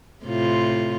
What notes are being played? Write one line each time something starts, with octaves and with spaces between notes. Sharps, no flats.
A2 C3 F4